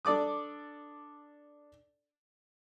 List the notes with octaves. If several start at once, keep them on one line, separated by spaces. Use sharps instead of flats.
D4 A4 D5 D6 D#6